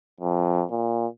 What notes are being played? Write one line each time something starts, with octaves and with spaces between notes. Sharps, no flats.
F2
A#2